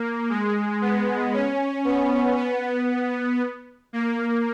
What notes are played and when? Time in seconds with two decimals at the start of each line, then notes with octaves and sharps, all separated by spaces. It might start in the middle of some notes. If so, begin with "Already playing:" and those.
Already playing: A#3
0.29 G#3
0.81 B3
1.33 C#4
1.85 B3
2.38 B3
3.93 A#3